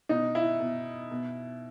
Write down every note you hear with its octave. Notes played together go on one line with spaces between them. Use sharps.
B2 D#4
E4
B2
B2